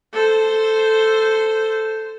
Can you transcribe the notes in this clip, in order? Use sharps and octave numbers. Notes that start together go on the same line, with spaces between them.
A4 C5